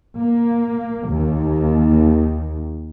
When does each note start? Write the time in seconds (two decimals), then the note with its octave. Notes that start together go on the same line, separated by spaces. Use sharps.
0.18 A#3
1.08 D#2